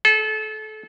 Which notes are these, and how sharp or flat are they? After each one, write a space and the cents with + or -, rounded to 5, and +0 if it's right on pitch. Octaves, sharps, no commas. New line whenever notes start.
A4 -30